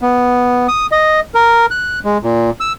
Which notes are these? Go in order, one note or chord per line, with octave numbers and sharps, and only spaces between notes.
B3
D#6
D#5
A#4
F#6
G#3
A#2
E6